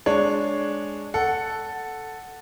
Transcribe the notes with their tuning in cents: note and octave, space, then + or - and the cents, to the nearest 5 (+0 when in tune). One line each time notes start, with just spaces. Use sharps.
G#3 +0 D4 +0 C#5 +0
A4 +0 F#5 +0